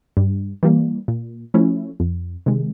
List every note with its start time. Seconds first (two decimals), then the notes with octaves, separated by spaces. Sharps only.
0.17 G2
0.63 E3 G3 A#3
1.08 A#2
1.54 F3 A3 C#4 E4
2.00 F2
2.46 C3 D#3 G#3